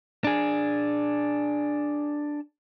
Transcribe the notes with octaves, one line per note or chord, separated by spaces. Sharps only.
D4 G#4